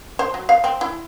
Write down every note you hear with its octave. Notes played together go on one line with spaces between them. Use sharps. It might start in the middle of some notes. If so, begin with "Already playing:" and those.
C5
F#3
F5
C4
E4